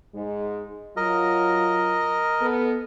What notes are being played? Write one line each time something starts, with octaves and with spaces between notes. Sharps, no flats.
G#2 G#3
F#3 F4 A#4 D#5
B3 A4